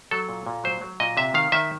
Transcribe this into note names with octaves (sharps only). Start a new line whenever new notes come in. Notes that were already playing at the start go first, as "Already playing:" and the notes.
F#3 A4
A#2
A#2
F#3 C5
F#3
A#2 D#5
C3 E5
D#3 F5
D#3 E5